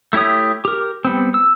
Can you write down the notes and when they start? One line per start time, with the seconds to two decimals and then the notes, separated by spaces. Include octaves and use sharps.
0.13 A3 E4 G4 C#5 D#6
0.65 G4 A#4
1.05 G3 B3 C4
1.34 E6